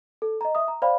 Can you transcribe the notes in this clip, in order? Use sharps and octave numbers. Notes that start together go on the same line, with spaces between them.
A4
D#5 A#5
E5 D#6
A#5
C5 D5 F5 G5 B5